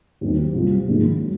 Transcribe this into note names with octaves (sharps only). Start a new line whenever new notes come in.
D#2 D#3 F#3 C4
C2 C3 F#3 C4 F4
A#1 G#2 D#3
F#3